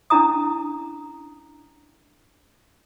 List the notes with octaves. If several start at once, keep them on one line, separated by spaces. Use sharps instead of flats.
C#4 D4 E4 A#5 D#6